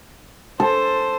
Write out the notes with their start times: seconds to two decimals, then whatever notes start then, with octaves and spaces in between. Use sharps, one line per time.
0.60 A4 C5